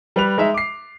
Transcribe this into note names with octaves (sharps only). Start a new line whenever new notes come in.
G3 B4 F7
G#3 D#4 E5
D6 C7